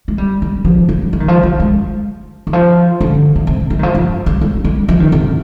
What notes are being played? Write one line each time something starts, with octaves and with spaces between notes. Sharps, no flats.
G#3
G3
G3
F3
G3
G3
D#3
F3
G3
G#3
D#3
F3
D3
D3
C3
G3
D#3
F3
F3
G3
G#3
G3
F3
D#3
C3